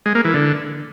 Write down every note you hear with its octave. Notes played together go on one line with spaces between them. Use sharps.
G#3
A#3
E3
D3